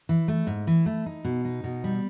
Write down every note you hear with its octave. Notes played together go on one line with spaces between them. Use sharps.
E3
A3
G#2
E3
A3
D#4
B2
D#4
B2
G3